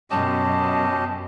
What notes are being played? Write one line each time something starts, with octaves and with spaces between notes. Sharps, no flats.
F#2 B2 C#4 G4 D#5 A5